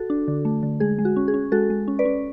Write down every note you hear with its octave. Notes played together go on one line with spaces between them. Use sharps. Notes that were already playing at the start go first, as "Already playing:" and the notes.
Already playing: F#4 A4
D4
D3
A3
D3
G#3 G#4
G#3
F#4
C#4
G#4
C#4
G#3 F#4 A4
G#3
C#4
B4 D5
C#4